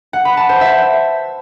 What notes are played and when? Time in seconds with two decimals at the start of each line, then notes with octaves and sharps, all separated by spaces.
0.13 F#5
0.25 B5
0.37 A5
0.49 C5
0.61 E5